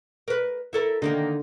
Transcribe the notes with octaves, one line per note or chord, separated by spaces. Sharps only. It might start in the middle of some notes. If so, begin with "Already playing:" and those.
A#4 B4
E4 A4 A#4
D3 D#3 A#3 D#4